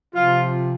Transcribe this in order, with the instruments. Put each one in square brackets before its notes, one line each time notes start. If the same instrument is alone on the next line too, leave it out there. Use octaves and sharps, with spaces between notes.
[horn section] C3 F3 F4